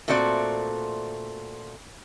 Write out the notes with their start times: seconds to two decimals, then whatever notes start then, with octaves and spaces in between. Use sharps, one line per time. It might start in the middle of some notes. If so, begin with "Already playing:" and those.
0.08 A#2 A3 C4 F#4 D5